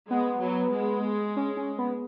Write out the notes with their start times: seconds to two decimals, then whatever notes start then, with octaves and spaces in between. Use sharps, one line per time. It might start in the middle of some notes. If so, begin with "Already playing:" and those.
0.11 G#3 B3
0.41 F#3
0.74 G#3
1.36 C#4
1.57 C#4
1.78 B3